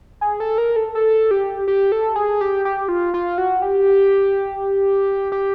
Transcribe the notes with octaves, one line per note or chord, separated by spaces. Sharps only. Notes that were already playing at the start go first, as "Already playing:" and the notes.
G#4
A4
A#4
A4
A4
G4
G4
A4
G#4
G4
G4
F4
F4
F#4
G4
G4